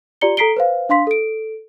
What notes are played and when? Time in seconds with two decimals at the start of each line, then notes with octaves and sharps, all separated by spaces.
0.21 F4 G4 D5 A#5 C#7 G7
0.37 A4 A#5 B6 C7 D7 G7
0.56 B4 C5 F5
0.89 D4 F5 C6 B6
1.07 A4 D7